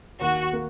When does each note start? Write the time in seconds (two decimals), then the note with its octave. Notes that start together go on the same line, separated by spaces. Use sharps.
0.21 D#2 F#4
0.53 A#3